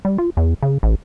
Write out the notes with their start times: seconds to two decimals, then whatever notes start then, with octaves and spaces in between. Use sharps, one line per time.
0.05 G3
0.18 F4
0.37 E2
0.62 C#3
0.83 A1